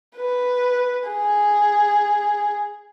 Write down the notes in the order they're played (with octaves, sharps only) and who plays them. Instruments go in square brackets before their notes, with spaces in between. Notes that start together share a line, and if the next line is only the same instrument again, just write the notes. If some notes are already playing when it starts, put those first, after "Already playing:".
[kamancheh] B4
G#4